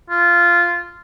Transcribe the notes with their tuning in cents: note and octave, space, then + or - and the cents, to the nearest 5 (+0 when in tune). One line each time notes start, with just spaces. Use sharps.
F4 -10